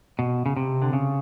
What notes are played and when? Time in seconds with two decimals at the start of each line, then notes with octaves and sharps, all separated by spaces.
0.19 B2
0.46 C#3
0.57 C3
0.82 D3
0.93 C#3